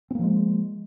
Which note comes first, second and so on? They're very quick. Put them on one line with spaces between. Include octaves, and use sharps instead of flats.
C4 A#3 F3 G#3